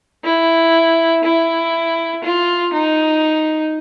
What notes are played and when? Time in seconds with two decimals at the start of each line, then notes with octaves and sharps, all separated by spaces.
0.24 E4
1.24 E4
2.24 F4
2.73 D#4